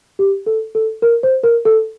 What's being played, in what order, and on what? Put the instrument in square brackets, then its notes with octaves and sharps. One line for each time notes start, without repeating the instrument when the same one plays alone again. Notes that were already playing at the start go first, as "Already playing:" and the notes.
[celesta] G4
A4
A4
A#4
C5
A#4
A4